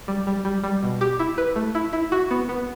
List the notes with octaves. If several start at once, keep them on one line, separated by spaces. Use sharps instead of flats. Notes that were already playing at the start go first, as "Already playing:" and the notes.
G3
G3
G3
G3
B2
G4
E4
B4
A3
E4
E4
F#4
B3
B3